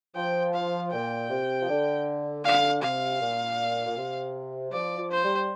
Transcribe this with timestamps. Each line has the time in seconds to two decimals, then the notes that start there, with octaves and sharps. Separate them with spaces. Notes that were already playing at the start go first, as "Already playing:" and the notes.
0.15 F3 G5
0.54 F5
0.92 A#2 G5
1.30 C3
1.61 F3
1.68 D3
2.44 D3 F5
2.82 C3 F5
3.21 A#2
3.86 A#2
3.97 C3
4.69 G3
4.73 F3 D5
4.98 F3
5.11 C5
5.24 G3